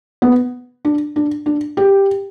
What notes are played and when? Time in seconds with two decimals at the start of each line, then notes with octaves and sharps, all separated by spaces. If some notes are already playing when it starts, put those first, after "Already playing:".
0.22 B3
0.85 D4
1.16 D4
1.46 D4
1.77 G4